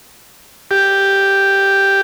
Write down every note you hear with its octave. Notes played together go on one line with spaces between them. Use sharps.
G4